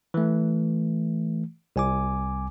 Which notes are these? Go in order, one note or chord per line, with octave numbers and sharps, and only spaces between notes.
E3 A3
C2 G#5 D6